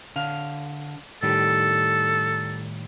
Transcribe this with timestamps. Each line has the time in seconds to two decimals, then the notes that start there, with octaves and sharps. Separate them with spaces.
0.16 D3 F5
1.23 A2 D#3 G3 A4